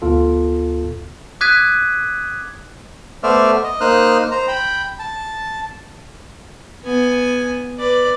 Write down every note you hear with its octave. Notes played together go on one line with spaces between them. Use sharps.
D2 B3 F4 A4
D6 D#6 F#6 G#6 B6 D#7
A3 B3 C5 D5 E5 F6
D#5
A#3 D#4 C5 D#6 F6 F#6
C5 A#5
G5 B5
A5
B3 G#5
B4 D5